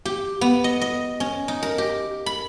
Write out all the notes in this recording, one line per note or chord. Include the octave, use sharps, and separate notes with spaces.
G4
B3
D#5
D#5
C#4
D#4
A#4
G4
B5